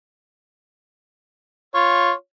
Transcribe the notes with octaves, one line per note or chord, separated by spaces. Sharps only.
F4 C#5